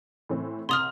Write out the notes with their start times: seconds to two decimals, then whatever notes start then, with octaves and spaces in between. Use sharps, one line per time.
0.29 A2 E3 C4
0.69 C2 C6 D#6 F6 F7